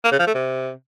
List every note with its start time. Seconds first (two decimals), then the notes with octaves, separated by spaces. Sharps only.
0.04 A#3
0.12 C#3
0.20 F3
0.27 A3
0.35 C3